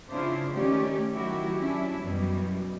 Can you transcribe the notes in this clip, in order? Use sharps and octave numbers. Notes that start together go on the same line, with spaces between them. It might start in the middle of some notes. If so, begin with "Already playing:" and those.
C#3 D4 E4 F4 C5
D#3 A3 C#4 G4 D5
D#3 F#3 A3 E4 F#4 G4
F#3 C#4 D4 E4
F#2 B2 E3 G3